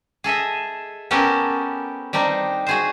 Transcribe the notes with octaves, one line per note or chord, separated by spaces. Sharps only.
G#4 A4 D#5 E5
B3 C#4 G4 A4 A#4
G3 C4 D4 D#4
F#4 G#4 C5